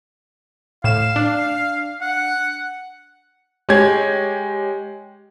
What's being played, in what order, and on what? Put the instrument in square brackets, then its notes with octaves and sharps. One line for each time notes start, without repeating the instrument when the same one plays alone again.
[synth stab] A2 E7 [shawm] F5
[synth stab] D4
[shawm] F#5
[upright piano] G#3 G4 C#5 G#6